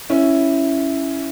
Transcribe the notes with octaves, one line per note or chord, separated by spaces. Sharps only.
C#4 E4